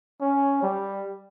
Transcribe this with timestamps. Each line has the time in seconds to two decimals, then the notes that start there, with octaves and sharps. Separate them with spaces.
0.21 C#4
0.63 G3